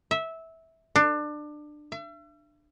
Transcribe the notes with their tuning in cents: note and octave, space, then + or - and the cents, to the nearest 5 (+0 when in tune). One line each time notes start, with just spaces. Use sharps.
E5 -15
D4 +25
E5 +40